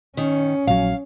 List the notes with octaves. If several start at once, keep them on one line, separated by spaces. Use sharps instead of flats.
D#3 C#4
A#1 F#3 F5